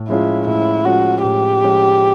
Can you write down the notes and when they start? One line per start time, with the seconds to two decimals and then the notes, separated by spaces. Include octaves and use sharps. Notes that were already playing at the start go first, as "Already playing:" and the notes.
Already playing: A2
0.08 F3 G#3 C#4 E4 F4
0.47 A2 E4
0.85 F3 G#3 C#4 F4 F#4
1.23 A2 G4
1.62 F3 G#3 C#4 F4